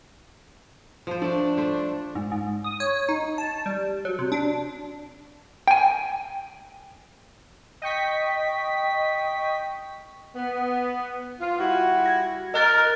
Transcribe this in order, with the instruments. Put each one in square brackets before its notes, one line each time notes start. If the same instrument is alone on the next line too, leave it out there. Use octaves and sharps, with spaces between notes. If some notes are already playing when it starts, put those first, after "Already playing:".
[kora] F3 C5
[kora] A3 [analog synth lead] D4
[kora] A3 C5
[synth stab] G#2
G#2
D#6
C#5
D#4
A5
G3
F#3
C3
D4
[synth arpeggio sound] G5 G#5
[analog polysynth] D#5 G5 C#6 B6
[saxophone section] B3
F4
G3 E4 F#4
[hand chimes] G#6 A#6
[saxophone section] A#4 [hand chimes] D#5 F#6 A6